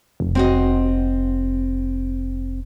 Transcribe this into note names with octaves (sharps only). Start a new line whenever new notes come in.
F1
C4 F#4 D#5